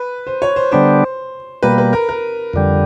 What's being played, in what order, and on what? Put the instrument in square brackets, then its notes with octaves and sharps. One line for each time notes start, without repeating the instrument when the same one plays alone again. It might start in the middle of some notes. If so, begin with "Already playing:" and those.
Already playing: [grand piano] B4
C5
C#5
C5
[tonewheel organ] D3 G3 B3 D4 [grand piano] C5
[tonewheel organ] B2 G3 A#3 [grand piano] B4
[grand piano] B4
A#4
A#4
[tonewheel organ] F2 D3 G3